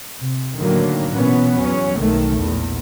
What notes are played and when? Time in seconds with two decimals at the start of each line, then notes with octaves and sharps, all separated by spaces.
0.20 C3
0.58 A2 D3 D#3 F#3 A#3
1.15 B2 E3 B3 C#4
1.59 E2 F#3 C#4
2.00 B1 D#3 A3
2.40 A#1 E2